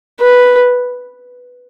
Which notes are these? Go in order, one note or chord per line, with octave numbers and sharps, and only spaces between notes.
B4